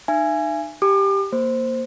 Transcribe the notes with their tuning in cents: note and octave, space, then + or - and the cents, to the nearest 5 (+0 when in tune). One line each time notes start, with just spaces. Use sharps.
D#4 -35 E5 +40 G#5 +0
G4 +0 G#5 +25 D6 +40
A#3 +0 C5 +0